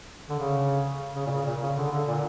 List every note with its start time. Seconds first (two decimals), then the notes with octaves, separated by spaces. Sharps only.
0.30 D3
0.39 C#3
1.15 C#3
1.26 A#2
1.31 C#3
1.45 A#2
1.61 C#3
1.77 D3
1.92 D3
2.07 A#2